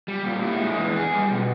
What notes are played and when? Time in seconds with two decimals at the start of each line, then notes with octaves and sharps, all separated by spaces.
0.08 G3
0.25 A#2
0.42 E4
0.60 G#3
0.78 E3
0.96 G#4
1.14 G3
1.31 B2